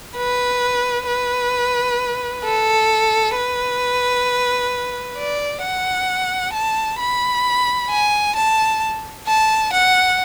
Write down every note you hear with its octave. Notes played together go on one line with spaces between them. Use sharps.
B4
B4
A4
B4
D5
F#5
A5
B5
G#5
A5
A5
F#5